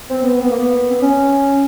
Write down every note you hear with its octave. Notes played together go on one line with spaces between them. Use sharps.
C4
B3
B3
A#3
B3
C4
C#4